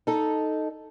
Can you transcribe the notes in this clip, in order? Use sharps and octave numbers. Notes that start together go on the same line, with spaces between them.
D#4 A4